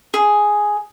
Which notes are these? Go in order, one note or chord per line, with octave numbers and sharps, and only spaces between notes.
G#4